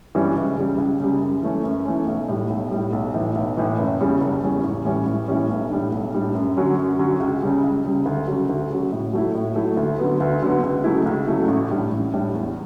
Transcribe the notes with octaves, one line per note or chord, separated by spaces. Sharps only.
G2 E3 G3 C#4
C#2
C#3 G3
C#2
C#3 G3
F#2
E3 A3 C#4
F#2
E3 A3 C#4
B1
A2 G3
B1
A2 G3
B1
A2 E3
B1
A2 E3
F#1
E2 C#3 G3 C#4
F#1
E2 C#3 G3 C#4
A1
A2 E3 G3 C#4
A1
A2 E3 G3 C#4
B1
A2 G3 D4
B1
A2 G3 D4
F#2
D3 F#3 C#4
F#2
D3 F#3 C#4
C#2
C#3 G3
C#2
C#3 G3
D2
C#3 F#3
D2
C#3 F#3
A2
F#3 A3 E4
A2
F#3 A3 E4
D2
D3 F#3 B3
D2
D3 F#3 B3
C#2
C#3 F#3 A3 E4
C#2
C#3 F#3 A3 E4
A1
A2 G3 D4
A1
A2 G3 D4
E2